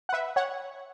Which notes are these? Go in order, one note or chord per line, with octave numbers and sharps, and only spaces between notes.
F#5
B4 E5
C#5 F#5